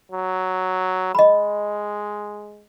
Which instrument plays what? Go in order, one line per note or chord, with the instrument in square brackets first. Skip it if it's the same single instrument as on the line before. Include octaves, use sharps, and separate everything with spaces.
[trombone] F#3
[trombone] G#3 [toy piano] D#5 B5